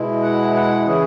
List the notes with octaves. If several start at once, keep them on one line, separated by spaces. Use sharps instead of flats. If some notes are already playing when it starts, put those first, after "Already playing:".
Already playing: B2 G#3 E4
F#5
F#5
C#3 E3 C#4 E4 G#4